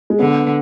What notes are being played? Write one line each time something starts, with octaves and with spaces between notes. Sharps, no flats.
G#3
D3 B3